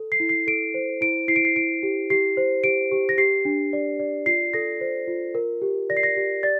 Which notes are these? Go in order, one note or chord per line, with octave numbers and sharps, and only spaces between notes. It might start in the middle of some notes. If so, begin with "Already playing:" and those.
Already playing: A4
C7
E4
C7
A4 D7
C5
E4 D7
E4 C7
D7
C7
E4 D7
G4
G4 C7
C5
G4 D7
G4
A#6
G4 C7
D4
D5
D5
F4 C7
A4 A#6
C5
F4
A#4
G4
D5 A#6
C7
A#6
G4
D5 A6